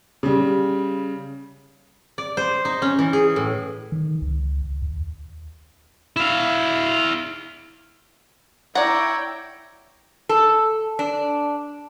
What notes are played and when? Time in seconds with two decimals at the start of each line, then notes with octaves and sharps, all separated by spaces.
0.23 C#3 G3
2.18 D5
2.37 C5
2.65 D#4
2.82 C#4
2.99 E3
3.13 G#4
3.36 A2
3.92 D#3
4.22 C#2
4.82 D#2
6.16 E4 F5
8.75 E4 C#5 D5 F#5 G5 A#5
10.29 A4
10.99 D4